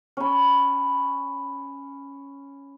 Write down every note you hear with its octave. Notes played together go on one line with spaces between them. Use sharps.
C#4 B5